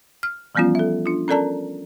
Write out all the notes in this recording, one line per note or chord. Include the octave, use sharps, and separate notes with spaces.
F6
E3 F3 G3 B3 C#4 F4
A4 E5
D4 F4
C#4 A4 A#4 D5 A5 A#5